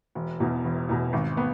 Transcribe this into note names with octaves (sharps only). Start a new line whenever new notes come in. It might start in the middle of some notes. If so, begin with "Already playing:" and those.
E1
E2 B2
E1
E2 B2
G#1
B3